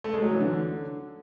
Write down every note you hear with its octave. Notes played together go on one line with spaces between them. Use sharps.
A3
G#3
F#3
E3
D3